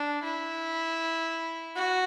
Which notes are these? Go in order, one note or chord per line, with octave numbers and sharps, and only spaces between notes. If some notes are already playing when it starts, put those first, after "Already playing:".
Already playing: D4
E4
F#4